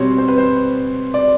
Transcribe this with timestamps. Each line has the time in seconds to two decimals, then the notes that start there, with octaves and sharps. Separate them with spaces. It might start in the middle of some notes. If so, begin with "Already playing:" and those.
Already playing: B2 G3 C4 C#5
0.18 C5
0.28 B4
0.38 C5
1.14 D5